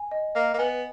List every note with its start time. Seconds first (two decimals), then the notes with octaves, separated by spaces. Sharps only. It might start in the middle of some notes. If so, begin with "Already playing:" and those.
Already playing: G#5
0.11 D#5
0.35 A#3 D#5
0.54 A#3
0.58 B3 G#5